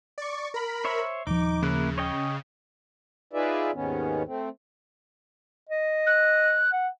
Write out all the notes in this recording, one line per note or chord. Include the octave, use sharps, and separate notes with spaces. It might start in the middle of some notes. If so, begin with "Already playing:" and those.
D5 C#6
A#4 B5
C5 C#5 E5
D#1 F3 D#4 D6
C#3 A#3 E4 F#6
C#5 D#5 G5
D#4 F4 G#4 B4 D5 E5
D#2 G#2 D#3 B3 C#4
A3 C4
D#5
F#6
F#5